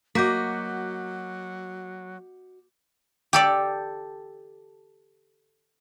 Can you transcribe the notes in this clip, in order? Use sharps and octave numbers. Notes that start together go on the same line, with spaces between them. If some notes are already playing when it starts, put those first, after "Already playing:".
F#3 A#3 F#4 D#5 D6 G6 B6
G4 A4 D5